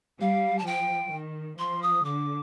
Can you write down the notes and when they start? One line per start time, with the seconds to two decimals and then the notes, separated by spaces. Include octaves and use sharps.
0.20 G3 F5
0.58 A5
0.66 F3 G5
1.12 D#3
1.58 F3 C6
1.82 D#6
2.04 D3 D6